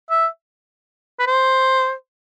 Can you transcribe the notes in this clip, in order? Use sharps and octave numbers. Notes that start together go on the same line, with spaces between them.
E5
B4
C5